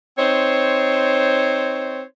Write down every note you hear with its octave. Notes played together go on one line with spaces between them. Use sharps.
C4 D#4 C5 C#5